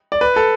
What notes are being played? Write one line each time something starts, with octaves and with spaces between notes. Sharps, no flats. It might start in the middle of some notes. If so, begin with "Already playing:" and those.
D5
B4
A4